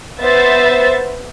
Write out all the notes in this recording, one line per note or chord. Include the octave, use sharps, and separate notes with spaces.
B3 C5 E5 A6